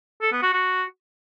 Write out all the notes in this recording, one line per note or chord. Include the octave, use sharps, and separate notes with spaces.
A4
B3
F#4
F#4